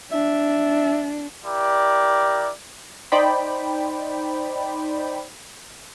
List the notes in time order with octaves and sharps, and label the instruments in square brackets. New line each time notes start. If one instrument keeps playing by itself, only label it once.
[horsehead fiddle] D4 [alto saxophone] E5
[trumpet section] E4 G4 A#4 D5
[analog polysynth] D#4 C5 D5 G5 B5